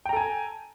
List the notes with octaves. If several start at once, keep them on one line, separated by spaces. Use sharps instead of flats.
A4 G5 G#5 A#5